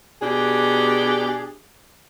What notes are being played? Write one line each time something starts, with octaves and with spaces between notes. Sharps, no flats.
B2 D4 G4 G#4